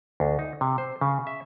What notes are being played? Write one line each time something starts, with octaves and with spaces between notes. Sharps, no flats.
D2
D#4
C3
C5
C#3
E5